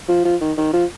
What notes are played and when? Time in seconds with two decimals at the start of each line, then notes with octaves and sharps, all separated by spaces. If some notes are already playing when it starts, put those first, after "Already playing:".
0.08 F3
0.25 F3
0.41 D#3
0.57 D#3
0.73 F3